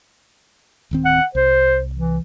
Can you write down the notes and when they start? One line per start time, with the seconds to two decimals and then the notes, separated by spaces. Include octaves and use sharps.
0.91 D1 D#3 C4
1.05 F#5
1.35 C2 C5
1.95 E3